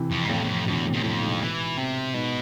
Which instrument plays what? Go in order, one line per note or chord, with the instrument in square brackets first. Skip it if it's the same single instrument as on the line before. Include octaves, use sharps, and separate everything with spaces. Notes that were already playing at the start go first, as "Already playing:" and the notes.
Already playing: [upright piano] C3 E3
[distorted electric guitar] F2
G#2
[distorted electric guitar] F2 [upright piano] A2 C3
[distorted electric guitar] E2
F2
[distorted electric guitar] F2 [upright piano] B2 D3
[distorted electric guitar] E2
[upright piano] A2 C3
[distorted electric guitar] E2
[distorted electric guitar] F2 [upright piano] A2
[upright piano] G#2 B2
[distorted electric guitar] E3
C3
[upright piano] G#2 [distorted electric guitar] B2